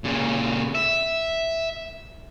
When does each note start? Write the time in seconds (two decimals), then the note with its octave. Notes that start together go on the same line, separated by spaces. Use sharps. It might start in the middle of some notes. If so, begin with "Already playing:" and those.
0.04 A#2 C#3
0.75 E5